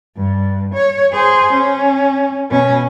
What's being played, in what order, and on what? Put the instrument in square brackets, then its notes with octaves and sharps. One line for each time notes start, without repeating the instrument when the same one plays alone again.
[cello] G2
C#5
G#4 C5
C#4
B2 C#4